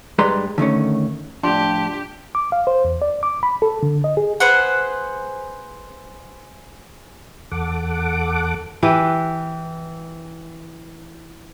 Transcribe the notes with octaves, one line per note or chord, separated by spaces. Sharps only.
G2 G#3 B4 D5 A#5 C6
D3 D#3 A3 C#4
A2 F3 D4 G4 A5 C6
D6
F5
C5
E2
D5
D6
B5
A4
D3
D#5
G#4
G#4 B4 C5 F#5
E2 A4 F#5 D6
E3 G4 B4